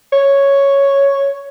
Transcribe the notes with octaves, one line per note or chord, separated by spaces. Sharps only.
C#5